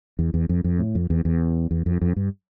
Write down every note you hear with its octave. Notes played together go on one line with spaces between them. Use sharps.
E2
E2
F2
F2
A2
F2
E2
E2
E2
F2
F2
G2